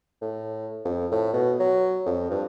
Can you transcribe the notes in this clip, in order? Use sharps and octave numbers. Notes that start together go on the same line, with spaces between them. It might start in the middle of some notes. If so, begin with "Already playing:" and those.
A2
F2
A2
B2
F#3
F2
G2